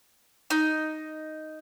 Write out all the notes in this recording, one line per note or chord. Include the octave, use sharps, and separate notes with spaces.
D#4